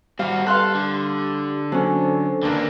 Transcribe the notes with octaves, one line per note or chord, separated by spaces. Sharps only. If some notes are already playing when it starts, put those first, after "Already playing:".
G3 C4 F#4 F5 F#5
G4 A4 B4 F5 C6 F#6
D3 G4
F#3 C#4 D4 A4 C5
D#2 D3 A#3 D4 B4